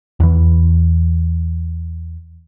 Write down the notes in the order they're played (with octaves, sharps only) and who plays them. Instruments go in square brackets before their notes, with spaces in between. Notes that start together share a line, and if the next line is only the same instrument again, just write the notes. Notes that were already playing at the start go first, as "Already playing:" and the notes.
[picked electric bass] E2 E3